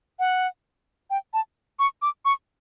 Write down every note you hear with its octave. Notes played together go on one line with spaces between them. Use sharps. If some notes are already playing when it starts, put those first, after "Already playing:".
F#5
G5
A5
C#6
D6
C#6